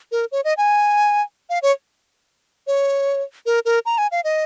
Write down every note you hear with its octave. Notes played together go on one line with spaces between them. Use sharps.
A#4
C#5
D#5
G#5
F5
C#5
C#5
A#4
A#4
A#5
G#5
F5
D#5